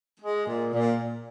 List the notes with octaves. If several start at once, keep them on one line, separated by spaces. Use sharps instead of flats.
G#3
A#2
A#2